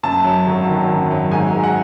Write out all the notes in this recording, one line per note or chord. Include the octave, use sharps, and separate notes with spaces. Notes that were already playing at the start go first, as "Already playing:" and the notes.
F#2 A5
F#3
G#1
D#3
F#2
F#3
G#2 G#5
G#3
F#5